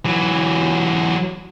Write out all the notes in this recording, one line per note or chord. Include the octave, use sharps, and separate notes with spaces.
E3 F#3